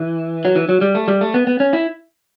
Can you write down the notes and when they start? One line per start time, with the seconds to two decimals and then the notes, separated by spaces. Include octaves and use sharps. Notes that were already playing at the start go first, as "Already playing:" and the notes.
Already playing: E3
0.45 F#3
0.55 E3
0.69 F#3
0.81 G3
0.95 A3
1.08 G3
1.21 A3
1.34 B3
1.47 B3
1.60 C#4
1.73 E4